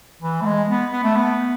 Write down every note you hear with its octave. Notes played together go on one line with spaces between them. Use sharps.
E3
A3
G#3
B3
B3
A3
B3